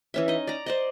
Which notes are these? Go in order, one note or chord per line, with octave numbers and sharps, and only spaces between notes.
E3 C#4 E5
D#4 D#5
D5 A#5
C5 D5 D#5